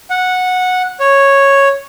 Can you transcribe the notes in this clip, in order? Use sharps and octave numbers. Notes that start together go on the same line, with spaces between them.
F#5
C#5